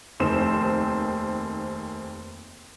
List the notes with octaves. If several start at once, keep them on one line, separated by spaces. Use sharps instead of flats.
F1 D#2 C4 E7